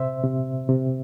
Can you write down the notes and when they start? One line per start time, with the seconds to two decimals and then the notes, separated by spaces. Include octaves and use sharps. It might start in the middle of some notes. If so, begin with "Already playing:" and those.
Already playing: C3 C5 E5
0.23 C3
0.69 C3